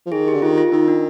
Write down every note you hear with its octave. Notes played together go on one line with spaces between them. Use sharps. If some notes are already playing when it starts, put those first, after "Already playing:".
F3
D#3 G#4
G4
D3
D#3 F4
F4
D#3 D#4
D4